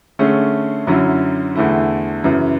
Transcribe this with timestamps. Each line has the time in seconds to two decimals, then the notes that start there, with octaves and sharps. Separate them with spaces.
0.19 D3 A3 C#4 G#4
0.87 F#2 D3 F#3 C#4 E4
1.56 E2 D3 A3 E4
2.24 F#2 C#3 E3